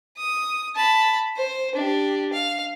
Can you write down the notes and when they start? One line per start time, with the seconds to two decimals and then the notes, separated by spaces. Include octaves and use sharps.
0.18 D#6
0.76 A5 B5
1.36 C5
1.75 D4 G4
2.33 F5